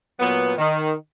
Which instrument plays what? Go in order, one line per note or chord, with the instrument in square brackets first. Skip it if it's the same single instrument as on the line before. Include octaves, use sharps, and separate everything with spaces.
[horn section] A#2 F#3 B3
D#3